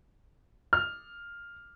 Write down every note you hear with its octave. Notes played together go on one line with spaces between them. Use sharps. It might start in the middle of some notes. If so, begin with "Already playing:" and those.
F6